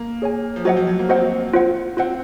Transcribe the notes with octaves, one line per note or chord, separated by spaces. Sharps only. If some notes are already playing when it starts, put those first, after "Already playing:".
Already playing: A#3
G#4 C#5 G#5
F3
F#3 F#4 C5 D#5 F#5
F3
F#3
A#3
C4 F#4 C5 D#5 F#5
F4 C5 F#5
C4 F4 C5 F#5